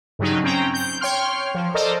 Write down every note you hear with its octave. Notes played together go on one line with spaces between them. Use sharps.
G2 C#3 F#3 D#4
C4 C#4 G5 A#5
G6
C#5 G5 C6 F6
F3
A4 A#4 C5 D5 D#5